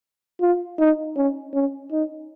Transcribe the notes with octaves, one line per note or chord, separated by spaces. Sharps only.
F4
D#4
C#4
C#4
D#4